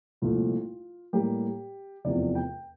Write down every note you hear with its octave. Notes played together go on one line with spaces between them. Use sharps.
C2 A#2 F3 A3 F4
A2 G3 A#3 G4
F1 E2 C3 F3 D5
G5